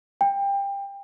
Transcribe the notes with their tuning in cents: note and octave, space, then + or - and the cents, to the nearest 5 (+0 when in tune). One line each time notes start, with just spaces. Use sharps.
G5 +25